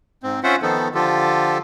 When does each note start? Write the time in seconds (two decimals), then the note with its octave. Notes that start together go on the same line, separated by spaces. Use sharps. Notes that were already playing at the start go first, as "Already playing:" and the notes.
0.23 G#2 C4
0.43 C#4 F4 C5 E5 F#5
0.62 D#3 F3 B3 D#4 A4
0.95 D3 F3 F4 G4 A4